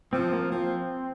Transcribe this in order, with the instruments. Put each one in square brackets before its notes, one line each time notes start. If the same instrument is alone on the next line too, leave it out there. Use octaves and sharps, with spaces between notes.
[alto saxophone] F3 [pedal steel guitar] C4
[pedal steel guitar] A#3
[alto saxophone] F3 [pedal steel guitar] C4